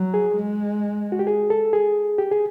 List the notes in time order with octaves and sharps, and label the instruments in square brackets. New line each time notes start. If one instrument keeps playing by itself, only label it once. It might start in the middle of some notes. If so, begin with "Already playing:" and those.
Already playing: [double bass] F#3
[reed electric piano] G#4
[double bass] G#3
[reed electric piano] F#4
G4
G#4
A4
G#4
G4
G#4